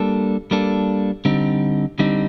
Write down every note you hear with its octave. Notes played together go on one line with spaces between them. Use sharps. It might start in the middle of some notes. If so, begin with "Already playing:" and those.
Already playing: G3 A#3 D4 A4
G3 A#3 D4 A4
D3 G3 C4 D#4
D3 G3 C4 D#4